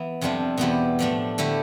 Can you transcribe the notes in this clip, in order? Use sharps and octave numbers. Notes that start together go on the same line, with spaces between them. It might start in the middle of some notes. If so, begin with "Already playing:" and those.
Already playing: E3 B3
F2 C3 G3 D4 F4
E2 B2 B3 E4 G4
A2 F3 A3 D4
D3 A3 E4 G4